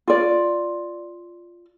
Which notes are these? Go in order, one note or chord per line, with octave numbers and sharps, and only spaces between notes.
F4 D5